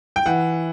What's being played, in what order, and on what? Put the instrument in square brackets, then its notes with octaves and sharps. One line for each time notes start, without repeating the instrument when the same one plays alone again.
[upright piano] G5
E3 F#5